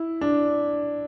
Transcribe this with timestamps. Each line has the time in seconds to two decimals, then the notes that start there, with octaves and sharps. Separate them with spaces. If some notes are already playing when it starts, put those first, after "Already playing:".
Already playing: E4
0.21 D4